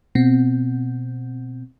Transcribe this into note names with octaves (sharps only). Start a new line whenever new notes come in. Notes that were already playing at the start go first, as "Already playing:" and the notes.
B2 C4